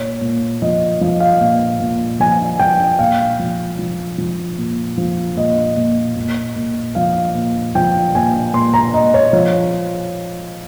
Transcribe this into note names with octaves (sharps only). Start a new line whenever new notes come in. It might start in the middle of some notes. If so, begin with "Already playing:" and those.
Already playing: A#2 C#5
A#2
F3 D#5
F3 D#5
F5
A#2
A#2
F3 G#5
F3 G5
A#2 F5
F3
F3
F3
A#2
F3
A#2 D#5
A#2
A#2
A#2
F3 F5
A#2
F3 G5
A#2 G#5
A#2 C6
A#5
A#2 D#5
C#5
F3 C#5